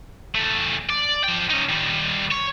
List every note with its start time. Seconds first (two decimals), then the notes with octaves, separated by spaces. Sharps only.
0.35 E2 A3
0.89 D5
1.24 F3 G5
1.50 C#4 D#4
1.69 D#3 G3
2.32 C#5